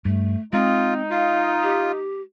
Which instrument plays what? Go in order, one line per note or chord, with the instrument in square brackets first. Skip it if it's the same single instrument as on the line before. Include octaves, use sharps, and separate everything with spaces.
[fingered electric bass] G2 [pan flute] A3
[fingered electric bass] G#3 [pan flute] C4 [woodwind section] D#4 [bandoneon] F4
[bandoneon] F4 [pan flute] F5
[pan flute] G4